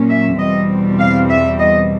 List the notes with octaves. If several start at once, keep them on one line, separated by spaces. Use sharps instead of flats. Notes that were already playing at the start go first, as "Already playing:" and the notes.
Already playing: A#2 F#3 A#3 C#4
E5
E2 B2 G3 C4 D#5
F5
E5
D#5